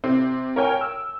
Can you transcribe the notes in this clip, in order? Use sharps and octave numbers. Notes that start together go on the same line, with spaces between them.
C3 C4
A#4 C#5 G5 G#5
E6